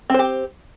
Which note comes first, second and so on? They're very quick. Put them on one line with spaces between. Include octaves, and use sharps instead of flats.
C4 C5 G4